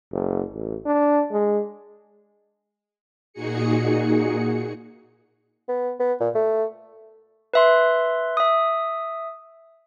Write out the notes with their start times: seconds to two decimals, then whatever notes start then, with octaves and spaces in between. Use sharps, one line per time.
0.11 F#1
0.54 A1
0.86 D4
1.32 G#3
3.33 A#2 D#4 F#4 G#4 C#7
5.68 B3
6.00 B3
6.20 A#2
6.35 A3
7.54 B4 E5 C6
8.37 E5 D#6